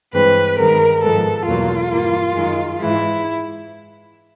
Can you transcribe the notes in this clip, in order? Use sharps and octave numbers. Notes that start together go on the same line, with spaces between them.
G2 E3 G#3 C4 B4
G2 D#3 G#3 B3 A#4
G#2 F3 G#3 B3 A4
E2 B2 F#3 A#3 F4
G2 E3 G3 A#3
F#2 D#3 G#3
G#2 E3 G#3 E4